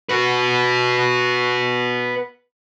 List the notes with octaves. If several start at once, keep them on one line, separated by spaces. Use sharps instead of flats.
F#4 B4